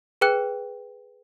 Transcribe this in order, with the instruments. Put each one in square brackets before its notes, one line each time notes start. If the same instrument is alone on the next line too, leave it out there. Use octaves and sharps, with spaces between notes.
[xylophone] G#4 B4 G5 F#6